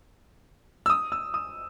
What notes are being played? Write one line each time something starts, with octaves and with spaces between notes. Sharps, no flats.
E6
D#6
E6
D#6